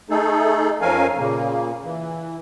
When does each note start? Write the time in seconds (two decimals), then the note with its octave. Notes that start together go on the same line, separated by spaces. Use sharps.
0.10 A3 D#4 G#4 A4
0.81 F2 F3 C#4 A#4 F5 G#5
1.18 A#2 C#3 A#3
1.84 E3